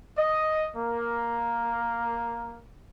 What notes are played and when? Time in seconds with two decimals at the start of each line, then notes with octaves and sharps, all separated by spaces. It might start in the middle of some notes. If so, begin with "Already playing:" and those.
0.16 D#5
0.75 A#3